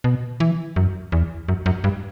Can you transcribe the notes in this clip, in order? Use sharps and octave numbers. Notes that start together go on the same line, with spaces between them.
B2
E3
F#2
E2
F#2
F#2
G2